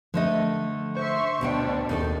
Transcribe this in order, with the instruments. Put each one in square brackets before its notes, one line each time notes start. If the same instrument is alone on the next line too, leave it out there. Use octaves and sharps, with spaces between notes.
[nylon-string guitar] D3 A3 D#5 [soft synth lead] F3
[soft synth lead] C5 [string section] E5 C6 C#6
[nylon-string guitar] D2 D3 G5 [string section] B2 D4
[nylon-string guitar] D#2 D#4 A4 [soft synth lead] C5